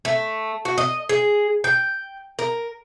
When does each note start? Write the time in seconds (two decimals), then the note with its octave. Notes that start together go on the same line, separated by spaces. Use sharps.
0.05 A3
0.65 F#4
0.78 D#5
1.09 G#4
1.64 G5
2.39 A#4